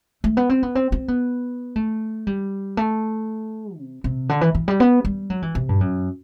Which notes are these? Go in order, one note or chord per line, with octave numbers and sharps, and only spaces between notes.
A3
B3
C4
B3
C4
C4
B3
A3
G3
A3
C3
C3
D3
E3
E3
G3
B3
G3
F#3
E3
C3
G2
F#2